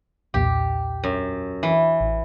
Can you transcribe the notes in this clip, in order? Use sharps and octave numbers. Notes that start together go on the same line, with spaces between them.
B1 E2 A#2 G4
F#2
E3
A1